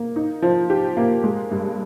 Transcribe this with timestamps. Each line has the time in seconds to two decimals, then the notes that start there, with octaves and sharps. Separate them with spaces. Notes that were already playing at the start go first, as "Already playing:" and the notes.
Already playing: A#3
0.16 D#4
0.42 F3
0.70 G4
0.97 A#3
1.24 G#3
1.51 G2